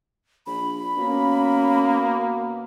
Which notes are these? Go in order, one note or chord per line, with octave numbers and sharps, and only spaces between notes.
A#1 B5
B2 A#3 C#4